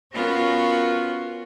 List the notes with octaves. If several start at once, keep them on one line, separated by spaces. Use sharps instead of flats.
B3 C#4 F4 F#4 A#4